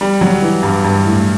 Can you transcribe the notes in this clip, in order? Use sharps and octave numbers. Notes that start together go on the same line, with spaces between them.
G3
F#3
E3
G2
G2
A2